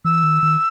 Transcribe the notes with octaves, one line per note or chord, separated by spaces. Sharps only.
E3 E6
D#3
D#3